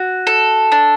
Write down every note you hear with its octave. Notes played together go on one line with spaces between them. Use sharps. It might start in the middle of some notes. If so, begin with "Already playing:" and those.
Already playing: F#4
A4
D4